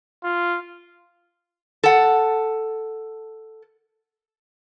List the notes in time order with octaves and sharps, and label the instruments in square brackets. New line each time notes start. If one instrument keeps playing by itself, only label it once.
[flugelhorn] F4
[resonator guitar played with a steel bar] A4 F#5